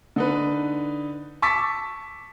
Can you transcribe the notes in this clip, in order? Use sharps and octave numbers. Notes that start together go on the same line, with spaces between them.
D3 D#4 B4
A5 C#6 D6 E6 A6 B6